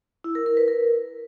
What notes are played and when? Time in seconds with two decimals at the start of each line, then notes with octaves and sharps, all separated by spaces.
0.24 E4
0.35 A#4
0.46 A#4
0.57 B4
0.68 A#4